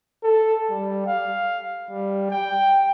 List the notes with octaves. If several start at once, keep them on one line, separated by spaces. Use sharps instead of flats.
A4
G3
F5
G3
G5